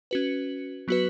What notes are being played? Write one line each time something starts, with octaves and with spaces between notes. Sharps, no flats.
C#4 F#4 B4
F#3 B3 F#4 B4